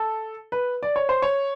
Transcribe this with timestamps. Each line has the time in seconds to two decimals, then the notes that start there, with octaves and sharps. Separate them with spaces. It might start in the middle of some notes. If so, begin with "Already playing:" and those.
Already playing: A4
0.52 B4
0.83 D5
0.96 C#5
1.09 C5
1.22 C#5